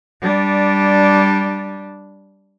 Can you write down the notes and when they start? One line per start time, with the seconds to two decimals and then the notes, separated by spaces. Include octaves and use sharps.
0.22 G3 D4